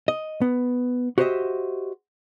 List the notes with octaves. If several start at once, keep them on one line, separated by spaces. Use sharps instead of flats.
D#5
B3
F#4 G4 C5 C#5 D#5 E5